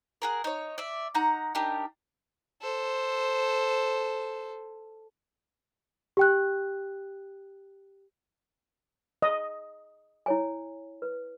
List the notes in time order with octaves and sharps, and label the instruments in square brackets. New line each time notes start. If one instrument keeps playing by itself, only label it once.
[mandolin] F#4 G#4 A#4
D#4 C#5
D5 E5
D#4 F#5 A#5
D4 D#4 G4 A#4
[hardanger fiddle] A4 C5
[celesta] G4 G5 F#6
[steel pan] D#5
[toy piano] E4 C#5 G#5
B4